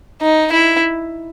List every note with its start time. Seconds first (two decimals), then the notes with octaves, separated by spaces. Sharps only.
0.22 D#4
0.52 E4